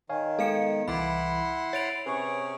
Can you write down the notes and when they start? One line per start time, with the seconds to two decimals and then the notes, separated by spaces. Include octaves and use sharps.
0.09 D#3 C#5 F5 G#5
0.39 G#3 B3 A4 F5 C#7
0.88 C2 E3 E4 F#5 B5 C6 D6
1.73 C#5 A6 D7 F7
2.06 C3 C#4 G#4 B4 C#6